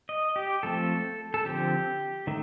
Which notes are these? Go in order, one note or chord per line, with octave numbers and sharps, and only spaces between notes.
D#5
G4
F3 A3 C4 A4
A4
D3 F3 C4 G4
D#3 A3